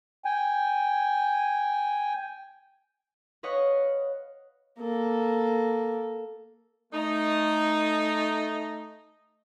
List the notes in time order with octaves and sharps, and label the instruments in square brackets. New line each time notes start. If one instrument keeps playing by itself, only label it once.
[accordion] G5 G#5
[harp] B4 C#5 D#5 F5 F#5 C#6
[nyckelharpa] A#3 A4
[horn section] A3 D#4